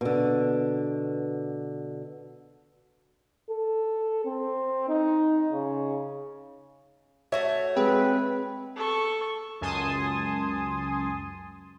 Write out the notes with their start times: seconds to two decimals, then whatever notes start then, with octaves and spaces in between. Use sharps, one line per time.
0.01 B2 D3
3.50 A4
4.25 C4
4.89 D#4
5.53 C#3
7.32 A3 F#4 C#5 E5
7.76 G#3 C4 B4
8.76 A4 C#6
9.61 C#2 F#2 G#5 A5 C6 D#6